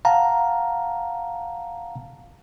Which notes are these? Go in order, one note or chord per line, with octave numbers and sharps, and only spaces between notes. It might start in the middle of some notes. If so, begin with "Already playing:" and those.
F5 F#5 A5 A#5